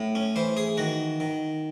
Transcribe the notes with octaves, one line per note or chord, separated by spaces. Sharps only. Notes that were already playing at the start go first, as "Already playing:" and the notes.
Already playing: A2
C#4
E3 C5
G#4
D#3 F#4
D#3